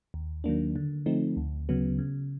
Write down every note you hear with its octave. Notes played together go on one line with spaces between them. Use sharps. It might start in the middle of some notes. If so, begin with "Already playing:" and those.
D#2
D#3 F#3 A#3 D4
D3
F3 A3 C4 D#4
D2
C#3 F#3 B3
C#3